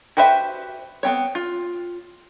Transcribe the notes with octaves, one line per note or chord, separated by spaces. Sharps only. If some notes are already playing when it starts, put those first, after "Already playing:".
F#4 G4 B4 C5 E5
B3 C4 C#5
F4